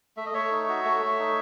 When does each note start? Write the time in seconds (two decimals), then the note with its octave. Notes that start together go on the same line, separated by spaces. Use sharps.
0.17 A3 E5
0.26 D#5
0.34 A3 C#5 E5
0.51 D#4
0.69 F#4
0.85 A3
1.02 A3
1.19 D#4